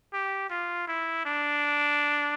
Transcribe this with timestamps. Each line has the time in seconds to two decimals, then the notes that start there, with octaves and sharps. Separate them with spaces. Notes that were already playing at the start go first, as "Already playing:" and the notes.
0.13 G4
0.50 F4
0.88 E4
1.26 D4